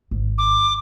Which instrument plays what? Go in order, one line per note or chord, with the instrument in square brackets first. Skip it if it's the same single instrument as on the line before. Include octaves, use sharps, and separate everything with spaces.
[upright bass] G#1
[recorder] D6